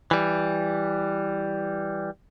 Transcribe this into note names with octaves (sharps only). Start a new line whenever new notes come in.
E3 G3